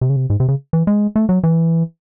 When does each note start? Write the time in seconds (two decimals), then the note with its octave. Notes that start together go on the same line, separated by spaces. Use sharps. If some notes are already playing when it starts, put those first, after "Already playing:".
0.01 C3
0.10 C#3
0.16 C3
0.30 G#2
0.40 C3
0.48 C#3
0.73 E3
0.87 G#3
1.16 A3
1.29 F#3
1.44 E3